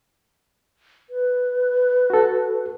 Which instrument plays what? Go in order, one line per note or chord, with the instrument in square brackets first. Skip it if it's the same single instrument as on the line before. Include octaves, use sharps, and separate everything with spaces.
[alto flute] B4
[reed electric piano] F#4 A4